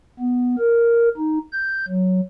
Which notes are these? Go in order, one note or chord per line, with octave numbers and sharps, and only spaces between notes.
B3
A#4
D#4
G6
F#3